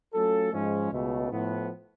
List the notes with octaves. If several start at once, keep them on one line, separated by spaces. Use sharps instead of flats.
F#3 A3 C#4 F4 A4
G#2 F3 G#3 C#4
C#2 B2 A3
A2 F3 B3